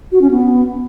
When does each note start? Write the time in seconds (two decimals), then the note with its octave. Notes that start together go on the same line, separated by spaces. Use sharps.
0.12 F#4
0.21 C#4
0.31 B3